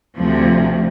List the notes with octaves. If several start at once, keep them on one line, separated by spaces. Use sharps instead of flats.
D2 C3 F3